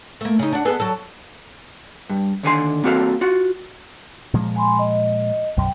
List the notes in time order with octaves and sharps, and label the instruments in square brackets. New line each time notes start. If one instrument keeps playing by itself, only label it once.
[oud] A3 A#3
C#3 D#4
D4 F#4
B3 G#4 A4
F#3 A4
[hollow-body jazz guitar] G2
D#2 D3 G#5 C6
A#3 C4 F#4 A4 F5
F4 F#4
[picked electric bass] A#2 F3 G#3
[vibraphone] G#5 B5 C6
D#5
[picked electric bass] B1 F#2 [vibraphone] G5